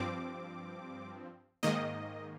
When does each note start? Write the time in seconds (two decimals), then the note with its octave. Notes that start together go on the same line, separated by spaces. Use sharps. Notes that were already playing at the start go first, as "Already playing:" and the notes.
Already playing: G2 F3 C4 D6
1.63 G#2 D#3 A#3 D#5